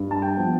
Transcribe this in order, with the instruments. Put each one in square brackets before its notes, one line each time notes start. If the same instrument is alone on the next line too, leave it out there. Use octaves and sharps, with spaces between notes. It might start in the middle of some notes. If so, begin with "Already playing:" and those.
Already playing: [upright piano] G2
A5
G5
F3 B3